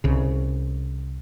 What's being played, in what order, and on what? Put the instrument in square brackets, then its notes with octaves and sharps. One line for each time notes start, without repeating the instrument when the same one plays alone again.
[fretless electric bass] C2 C#3